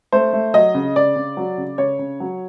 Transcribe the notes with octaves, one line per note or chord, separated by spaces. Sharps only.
A3 C5
A3
F#3 D#5
C#3
C#3 D5
C#3
F#3
C#3
C#3 C#5
C#3
F#3